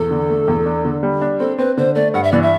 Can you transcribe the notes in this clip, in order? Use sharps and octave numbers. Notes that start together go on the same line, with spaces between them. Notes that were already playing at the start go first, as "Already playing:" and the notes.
Already playing: E2 A4
D3
A3
E2
D4
D3
G3
D4
C4 A4
C4 B4
D3 C5
A3 D5
G2 F#5
E5
E3 D5
E5